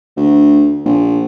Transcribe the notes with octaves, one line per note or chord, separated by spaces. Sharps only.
D2
A#1